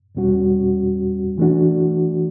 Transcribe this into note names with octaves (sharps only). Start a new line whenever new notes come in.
E2 B2 G3 C#4 F#4
E3 A3 D4 F#4